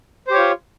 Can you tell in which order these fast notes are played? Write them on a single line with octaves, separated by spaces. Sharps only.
C5 G4 C#5 F4